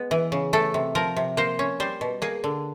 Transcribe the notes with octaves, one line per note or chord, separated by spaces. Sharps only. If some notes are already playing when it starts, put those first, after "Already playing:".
Already playing: G#3 B3
E3
C#3
A3 A4
C3
F3 A#4
C3
A#3 C5
C#4
G3 C5
B2
A#3 G#4
D3